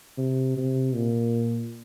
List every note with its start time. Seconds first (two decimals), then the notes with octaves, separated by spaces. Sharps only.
0.18 C3
0.57 C3
0.94 A#2